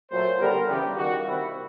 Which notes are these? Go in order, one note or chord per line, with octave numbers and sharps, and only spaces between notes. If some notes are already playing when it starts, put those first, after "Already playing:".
A#2 F#3 A3 C5
D3 G3 B3 A#4
C#3 E3 G3 B3 G4
D#3 G3 A#3 F#4
C3 D#3 G3 A#3 E4